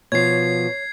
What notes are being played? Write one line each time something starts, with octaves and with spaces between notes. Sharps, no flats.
B2 F3 C#5 G#6 C7